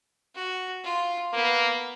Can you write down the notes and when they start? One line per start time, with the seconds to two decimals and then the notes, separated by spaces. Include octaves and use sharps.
0.35 F#4
0.84 F4
1.33 A#3 B3